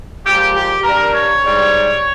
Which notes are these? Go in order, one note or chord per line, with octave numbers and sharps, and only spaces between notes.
A#2 F3 G#3 G4
G4
G2 G3 A#4
C#5
G#2 G3